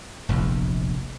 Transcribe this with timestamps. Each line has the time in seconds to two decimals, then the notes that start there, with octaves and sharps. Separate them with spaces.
0.29 F1 A#1 E2